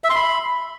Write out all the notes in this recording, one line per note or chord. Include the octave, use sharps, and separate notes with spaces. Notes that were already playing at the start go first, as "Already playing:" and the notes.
E5
C6
B5